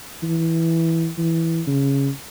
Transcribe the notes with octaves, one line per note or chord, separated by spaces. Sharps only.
E3
E3
C#3